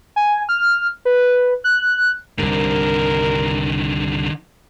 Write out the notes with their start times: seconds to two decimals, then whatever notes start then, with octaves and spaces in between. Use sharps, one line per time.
0.16 G#5
0.49 F6
1.05 B4
1.64 F#6
2.39 C2 G2 D3 D#3 A#4